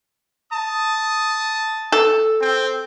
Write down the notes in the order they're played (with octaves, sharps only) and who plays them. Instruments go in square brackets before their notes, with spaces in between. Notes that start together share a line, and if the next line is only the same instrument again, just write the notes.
[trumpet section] A5 D#6
[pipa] A4
[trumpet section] C4 G5